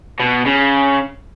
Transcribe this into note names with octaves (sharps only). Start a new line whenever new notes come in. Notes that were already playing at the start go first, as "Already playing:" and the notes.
B2
C#3